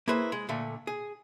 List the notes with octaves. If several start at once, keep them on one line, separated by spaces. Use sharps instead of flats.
A#3 E4 G#4 B4 C5
G#3
A#2 D3 A3
G#4